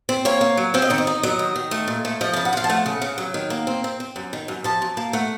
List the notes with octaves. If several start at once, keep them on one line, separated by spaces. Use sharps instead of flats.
C4
A#3 C#5
A#3
F#3
C4 F5
D#5
D#3 C#5
D#5
D#4
F#3 D#5
D#3
D#3
A3
A#2
A3
F3 D#5
C#3 A5
F#5
F3 F5
A5
A3 F#5
C#3
C#3
F#3
D#3
A#3
C4
C4
C4
F#2
D#3
F#2
F3 A5
F#2
A#3
A3 F#5